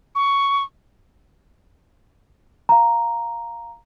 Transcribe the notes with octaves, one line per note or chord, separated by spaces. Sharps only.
C#6
F5 A#5